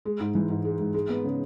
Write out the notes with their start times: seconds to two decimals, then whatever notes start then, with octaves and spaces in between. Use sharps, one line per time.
0.05 G#3
0.20 G#2
0.35 E3
0.50 G#2
0.65 G#3
0.80 G#2
0.94 G#3
1.09 B3
1.24 C#3